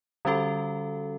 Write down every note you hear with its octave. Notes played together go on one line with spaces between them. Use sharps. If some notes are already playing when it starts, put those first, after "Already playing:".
D3 G3 C#4 F#4 A4